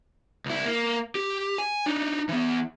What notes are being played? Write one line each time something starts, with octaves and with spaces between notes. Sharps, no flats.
C#2 E4
A#3
G4
G#5
D4 D#4
E3 B3